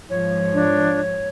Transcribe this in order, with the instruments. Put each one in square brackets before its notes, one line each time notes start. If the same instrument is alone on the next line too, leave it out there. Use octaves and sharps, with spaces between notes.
[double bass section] G#2 F3 [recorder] C#5
[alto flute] D4